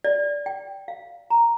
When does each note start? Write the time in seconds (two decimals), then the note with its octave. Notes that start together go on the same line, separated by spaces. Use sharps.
0.05 D5
0.46 G5
0.88 F5
1.30 A#5